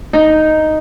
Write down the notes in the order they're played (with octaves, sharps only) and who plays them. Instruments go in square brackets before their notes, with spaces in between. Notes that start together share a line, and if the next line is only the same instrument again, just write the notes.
[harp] D#4